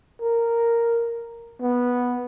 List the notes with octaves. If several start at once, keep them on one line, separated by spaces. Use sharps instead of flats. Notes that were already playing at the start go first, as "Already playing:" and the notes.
A#4
B3